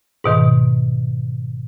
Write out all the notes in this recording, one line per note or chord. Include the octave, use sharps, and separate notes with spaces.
G#2 B2 D#3